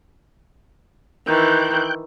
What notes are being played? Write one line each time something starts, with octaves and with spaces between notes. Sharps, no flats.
D#3 E3 G5 F#6 G6